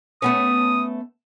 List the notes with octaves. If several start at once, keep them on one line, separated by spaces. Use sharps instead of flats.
A3 B3 C#4 D#6